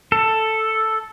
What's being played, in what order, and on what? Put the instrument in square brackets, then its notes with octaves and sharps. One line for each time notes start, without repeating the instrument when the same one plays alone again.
[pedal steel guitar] A4